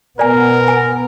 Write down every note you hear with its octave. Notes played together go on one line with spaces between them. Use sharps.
B2 B3 A#4 D5 G#5
G#5